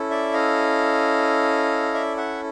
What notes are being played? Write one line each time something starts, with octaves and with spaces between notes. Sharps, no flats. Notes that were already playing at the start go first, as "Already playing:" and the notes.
Already playing: C#4 E4 A4
D5 E5
D#5 F5
D5 E5
E5 F#5